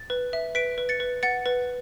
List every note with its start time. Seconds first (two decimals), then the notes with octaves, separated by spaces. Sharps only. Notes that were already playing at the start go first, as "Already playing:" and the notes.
Already playing: A6
0.10 B4
0.33 E5
0.55 B4 B6 D7
0.78 B4
0.89 A6 C#7
1.00 B4
1.23 F#5 A6 C#7
1.46 B4